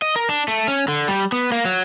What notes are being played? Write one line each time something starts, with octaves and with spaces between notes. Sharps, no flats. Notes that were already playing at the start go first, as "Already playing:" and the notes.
D#5
A#4
D4
A3
C#4
D3
G3
B3
A#3
F#3